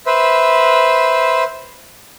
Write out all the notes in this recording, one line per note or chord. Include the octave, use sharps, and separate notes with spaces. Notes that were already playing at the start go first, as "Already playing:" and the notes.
B4 C5 E5